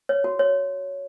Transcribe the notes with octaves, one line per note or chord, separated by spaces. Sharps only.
C#5
F#4
C#5